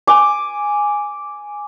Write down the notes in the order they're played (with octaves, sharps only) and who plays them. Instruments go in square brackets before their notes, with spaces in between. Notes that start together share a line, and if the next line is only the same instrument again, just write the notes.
[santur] G#5 D6